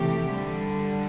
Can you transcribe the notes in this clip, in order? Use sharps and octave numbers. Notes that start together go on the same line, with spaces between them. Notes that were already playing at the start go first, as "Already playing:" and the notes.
Already playing: C3 E3 A3 G4
D3 G3